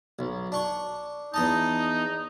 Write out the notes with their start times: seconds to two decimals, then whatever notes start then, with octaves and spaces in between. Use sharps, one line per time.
0.19 B1
0.52 D4 C#6
1.34 E2 D#4 D#5 A5